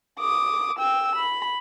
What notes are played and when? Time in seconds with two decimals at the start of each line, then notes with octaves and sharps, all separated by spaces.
0.19 D6 D#6
0.78 G5 E6
1.15 B5